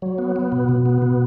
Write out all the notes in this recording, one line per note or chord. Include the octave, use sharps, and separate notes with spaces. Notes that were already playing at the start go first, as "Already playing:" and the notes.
F#3
B3
B3
B2
B2
B3
B2